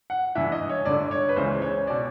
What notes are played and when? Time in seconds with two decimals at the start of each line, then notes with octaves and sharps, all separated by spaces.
0.10 F#5
0.35 G2 E3 E5
0.52 D#5
0.69 C#5
0.85 G2 D3 D5
1.11 C#5
1.29 B4
1.36 C#2 C#3 E3 C5
1.62 C#5
1.87 B2 D5